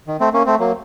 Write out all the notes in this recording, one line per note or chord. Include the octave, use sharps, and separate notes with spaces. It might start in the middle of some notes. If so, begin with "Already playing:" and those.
D#3
A3 C4
A#3 C#4
A3 C4
F#3 A#3